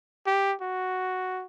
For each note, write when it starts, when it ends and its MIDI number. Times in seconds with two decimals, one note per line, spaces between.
0.27 0.54 67
0.61 1.46 66